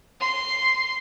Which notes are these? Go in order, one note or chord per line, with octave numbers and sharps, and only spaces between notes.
C6